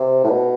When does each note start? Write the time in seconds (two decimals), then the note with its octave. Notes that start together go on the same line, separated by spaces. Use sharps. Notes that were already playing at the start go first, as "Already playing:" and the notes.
Already playing: C3
0.24 A2
0.30 B2